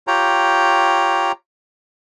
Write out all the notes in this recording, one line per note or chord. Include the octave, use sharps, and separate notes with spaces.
F4 G4 C#5 G5 A#5